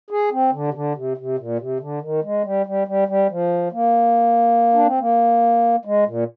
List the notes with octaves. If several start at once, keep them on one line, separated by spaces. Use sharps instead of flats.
G#4
C4
D3
C3
D3
C3
C3
A#2
C3
D3
D#3
G#3
G3
G3
G3
G3
F3
A#3
D4
C4
A#3
G#3
A#2